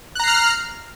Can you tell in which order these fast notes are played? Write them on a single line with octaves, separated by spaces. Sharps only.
F#6 A#5 C7 F6